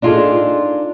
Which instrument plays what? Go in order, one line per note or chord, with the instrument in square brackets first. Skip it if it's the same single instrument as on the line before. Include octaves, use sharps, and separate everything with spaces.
[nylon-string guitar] D4 D#4 F4 G#4 A4